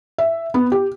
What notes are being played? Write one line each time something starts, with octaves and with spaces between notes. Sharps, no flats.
E5
B3
G4